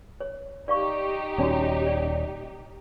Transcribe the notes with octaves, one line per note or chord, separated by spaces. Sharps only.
C#5
D#4 G4 D5 F5 C#6
D#1 C#4 F#4 D5
D5